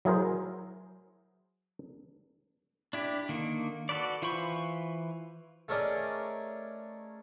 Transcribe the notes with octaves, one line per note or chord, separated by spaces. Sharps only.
F#3 E4 G#4 A#4 C5
D4 E4 G4
D3 D#3 A#3
F#4 A4 B4 D5
E3 F4 C5 B5 C#6
A3 C#4 G#4 A#4 D5 D#5